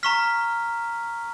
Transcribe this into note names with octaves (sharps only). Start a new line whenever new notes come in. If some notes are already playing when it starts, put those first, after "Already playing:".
A#5 C#6 F6 B6